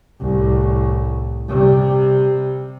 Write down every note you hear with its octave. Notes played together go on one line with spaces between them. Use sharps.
C2 A2
C3 G3